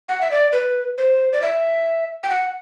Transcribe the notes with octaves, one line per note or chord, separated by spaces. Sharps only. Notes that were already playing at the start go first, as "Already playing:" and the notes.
F#5
E5
D5
B4
C5
D5
E5
G5
F#5